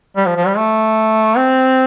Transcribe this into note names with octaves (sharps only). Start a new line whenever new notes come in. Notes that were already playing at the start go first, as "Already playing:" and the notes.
G3
F3
F3
G3
A3
C4